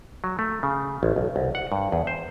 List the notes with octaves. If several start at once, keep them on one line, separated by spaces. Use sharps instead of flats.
F#3
A3
C#3
A1
B1
C2
F#5
G2
E2
C5